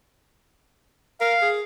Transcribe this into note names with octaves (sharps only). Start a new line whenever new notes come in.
A#4 F5
G#4